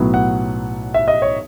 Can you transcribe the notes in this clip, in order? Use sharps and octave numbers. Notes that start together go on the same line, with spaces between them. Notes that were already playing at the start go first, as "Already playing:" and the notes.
Already playing: B1 A2 F#3 B3
F#5
E5
D#5
C#5